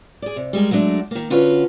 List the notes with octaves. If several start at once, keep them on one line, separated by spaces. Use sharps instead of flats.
G#4 D5
C3
G3 G#3 G#4 A#4
F#3 G#3 A3 D4
D#3 A#3
D3 C#4 F4 F#4 B4 C#5